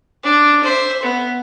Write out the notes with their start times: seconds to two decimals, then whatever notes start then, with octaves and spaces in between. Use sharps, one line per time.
0.24 D4
0.63 C5 E5
1.02 B3